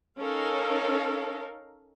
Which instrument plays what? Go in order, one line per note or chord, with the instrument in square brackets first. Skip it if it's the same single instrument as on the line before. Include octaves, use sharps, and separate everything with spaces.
[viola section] C#4 D#4 A4 A#4 F5